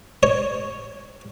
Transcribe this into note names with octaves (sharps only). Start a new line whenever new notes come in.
C#5